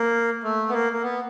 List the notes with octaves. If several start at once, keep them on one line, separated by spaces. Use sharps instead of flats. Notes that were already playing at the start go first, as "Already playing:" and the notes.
Already playing: A#3
A3
B3
A#3
A#3
B3